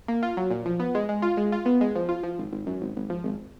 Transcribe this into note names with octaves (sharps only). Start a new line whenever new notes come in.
A#3
F4
F#3
A#2
F3
B3
G#3
G#3
F4
G#3
F4
B3
G#3
F3
F4
F3
G#1
G#1
F#2
G#1
G#1
F3
G#1